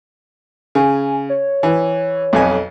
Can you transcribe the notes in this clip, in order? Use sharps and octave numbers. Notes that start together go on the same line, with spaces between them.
C#3 G#5
C#5
E3
B1 F2 G#5